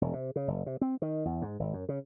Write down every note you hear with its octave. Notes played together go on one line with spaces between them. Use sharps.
E1
C3
C#3
F#1
C3
C4
D#3
E2
G#2
G#1
F#2
C#3